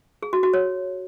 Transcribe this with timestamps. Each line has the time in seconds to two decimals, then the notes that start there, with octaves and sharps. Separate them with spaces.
0.23 G#4
0.33 F#4
0.43 F#4
0.54 C#5